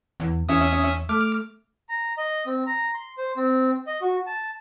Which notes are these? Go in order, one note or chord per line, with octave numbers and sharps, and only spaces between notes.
E2
E2 C#4 E5 D#6
A3 D6 F6
A#5
D#5
C4
A#5
C6
C5
C4
D#5
F#4
A5